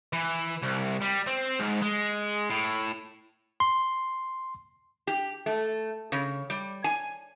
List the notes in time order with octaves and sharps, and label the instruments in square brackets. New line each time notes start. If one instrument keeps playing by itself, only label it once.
[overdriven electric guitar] E3
C2
G3
C4
G#2
G#3
A2
[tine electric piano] C6
[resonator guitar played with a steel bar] G4
A3
C#3
G3
G#5